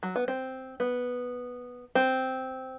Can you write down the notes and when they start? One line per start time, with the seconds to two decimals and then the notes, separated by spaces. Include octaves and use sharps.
0.03 F#3
0.16 B3
0.28 C4
0.80 B3
1.95 C4